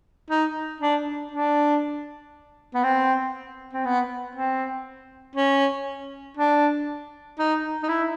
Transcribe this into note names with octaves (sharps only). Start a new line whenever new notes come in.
D#4
D4
D4
B3
C4
C4
B3
C4
C#4
D4
D#4
D#4
E4